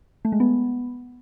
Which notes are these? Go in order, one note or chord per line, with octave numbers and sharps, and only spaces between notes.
A3
G#3
B3